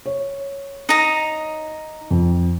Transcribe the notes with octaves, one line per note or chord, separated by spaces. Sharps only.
C#5
D#4 A#5
F2